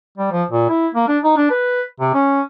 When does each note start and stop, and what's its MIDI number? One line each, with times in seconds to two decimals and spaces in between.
0.18 0.30 55
0.31 0.43 53
0.51 0.66 46
0.69 0.88 64
0.95 1.06 58
1.08 1.18 62
1.24 1.33 63
1.37 1.45 62
1.50 1.82 71
2.00 2.11 48
2.13 2.41 61